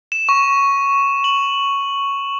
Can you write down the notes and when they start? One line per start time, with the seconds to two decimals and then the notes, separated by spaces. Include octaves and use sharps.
0.12 E7
0.29 C#6
1.24 F#7